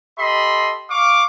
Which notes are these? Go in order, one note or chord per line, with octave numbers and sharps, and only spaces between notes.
G4 A4 D#5 B5 C6
F5 C#6 D6